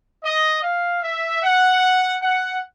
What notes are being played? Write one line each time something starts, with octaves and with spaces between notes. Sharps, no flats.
D#5
F5
E5
F#5
F#5